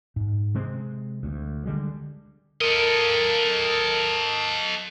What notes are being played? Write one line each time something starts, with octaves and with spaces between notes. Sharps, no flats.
G#2
C3 G#3 C4
D2
D3 G3 G#3
A4 A#4 D#5